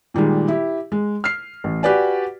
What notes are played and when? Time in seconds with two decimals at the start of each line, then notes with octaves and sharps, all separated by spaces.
0.14 A#2 D#3 G3 G#3
0.48 E4 G4
0.92 G#3
1.24 F6 C7
1.64 A1
1.83 F#4 G4 B4 D5 G#5